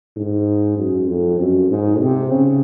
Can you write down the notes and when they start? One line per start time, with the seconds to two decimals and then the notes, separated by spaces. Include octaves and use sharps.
0.17 G#2
0.77 F#2
1.08 F2
1.40 F#2
1.70 G#2
2.01 C3
2.31 C#3